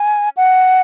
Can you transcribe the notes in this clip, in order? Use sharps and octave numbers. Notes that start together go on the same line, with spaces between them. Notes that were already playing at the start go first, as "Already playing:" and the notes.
Already playing: G#5
F#5